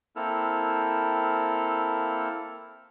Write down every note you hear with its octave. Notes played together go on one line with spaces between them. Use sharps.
A#3 C4 E4 A4 F6